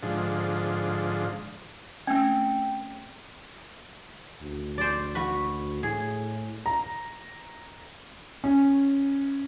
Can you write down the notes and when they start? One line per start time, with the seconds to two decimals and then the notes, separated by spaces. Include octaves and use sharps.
0.03 G#2 D3 F3
2.07 A3 C4 C#4 G5
4.42 D2
4.78 C5 D5
5.15 F#4 B4
5.83 A2 G#4
6.66 A#5
8.44 C#4